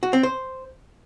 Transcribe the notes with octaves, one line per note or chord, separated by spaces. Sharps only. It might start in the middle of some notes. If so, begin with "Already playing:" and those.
F#4
C4
C5